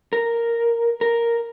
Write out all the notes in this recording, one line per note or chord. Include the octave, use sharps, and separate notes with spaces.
A#4
A#4